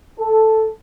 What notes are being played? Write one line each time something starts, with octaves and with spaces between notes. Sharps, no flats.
A4